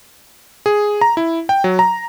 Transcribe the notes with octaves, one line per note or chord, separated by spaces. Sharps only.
G#4
A#5
E4
G5
F#3
A#5